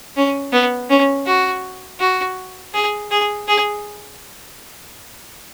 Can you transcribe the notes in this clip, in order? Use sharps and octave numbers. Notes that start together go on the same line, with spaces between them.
C#4
B3
C#4
F#4
F#4
G#4
G#4
G#4